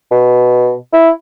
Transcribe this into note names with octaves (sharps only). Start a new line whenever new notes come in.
B2
E4